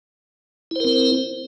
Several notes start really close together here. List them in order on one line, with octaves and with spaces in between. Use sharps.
E4 C5 A#4 C4